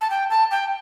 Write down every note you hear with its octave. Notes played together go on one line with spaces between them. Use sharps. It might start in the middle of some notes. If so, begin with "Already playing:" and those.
A5
G5
A5
G5